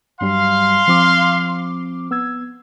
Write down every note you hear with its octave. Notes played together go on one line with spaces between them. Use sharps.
G2 F#3 G3 F5 C6
F3 C4 D6
B3 E6 G#6